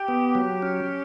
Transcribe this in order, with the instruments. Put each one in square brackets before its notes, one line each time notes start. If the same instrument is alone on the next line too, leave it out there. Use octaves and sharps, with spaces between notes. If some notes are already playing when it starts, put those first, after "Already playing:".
Already playing: [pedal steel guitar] G4
[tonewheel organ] B3
F#3
C#4